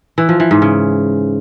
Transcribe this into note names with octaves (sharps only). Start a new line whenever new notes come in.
E3
F3
E3
G#2
C#3